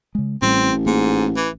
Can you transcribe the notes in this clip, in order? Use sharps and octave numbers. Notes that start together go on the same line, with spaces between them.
C#3 G#3
A1 A2 G3 C4
G#2 A#3
E3